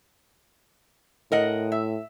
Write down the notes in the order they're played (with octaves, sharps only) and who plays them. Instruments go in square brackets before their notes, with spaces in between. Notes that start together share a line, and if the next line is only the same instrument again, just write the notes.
[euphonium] A2 [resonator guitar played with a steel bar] A#4 D#5 F#5
[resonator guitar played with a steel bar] E5